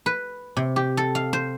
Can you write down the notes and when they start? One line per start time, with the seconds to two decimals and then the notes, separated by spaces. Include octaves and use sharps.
0.06 B4
0.57 C3
0.76 G4
0.97 A4
1.15 F5
1.33 C5